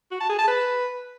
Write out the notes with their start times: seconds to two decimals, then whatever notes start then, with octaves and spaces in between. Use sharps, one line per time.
0.11 F#4
0.20 A5
0.29 G#4
0.39 A5
0.48 B4